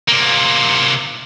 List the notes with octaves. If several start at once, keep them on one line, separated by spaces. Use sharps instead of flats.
C3 A#3